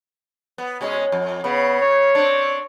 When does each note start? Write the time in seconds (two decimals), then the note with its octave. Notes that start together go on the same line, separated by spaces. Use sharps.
0.58 B3
0.81 B2 G#3 C#4
1.12 F2
1.44 C#3 B3
1.81 C#5
2.15 C4 D4